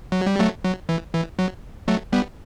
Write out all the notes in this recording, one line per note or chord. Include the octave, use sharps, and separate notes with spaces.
F#3
G3
F#3 A3
F#3
E3
E3
F#3
F#3 A3
G3 B3